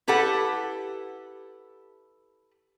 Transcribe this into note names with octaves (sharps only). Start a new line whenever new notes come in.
E4 G4 A4 B4 F#5